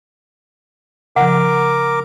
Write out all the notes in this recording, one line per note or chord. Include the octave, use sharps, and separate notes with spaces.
C#3 F3 A#4 F#5 D6